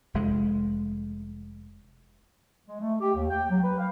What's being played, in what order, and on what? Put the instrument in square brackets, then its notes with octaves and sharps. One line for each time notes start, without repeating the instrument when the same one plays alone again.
[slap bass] F1 G#3
[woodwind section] G#3
A3
G4
D#2
G5
F#3
B4
F5